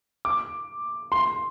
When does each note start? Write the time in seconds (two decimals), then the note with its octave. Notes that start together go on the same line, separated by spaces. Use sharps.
0.25 D6
1.12 C6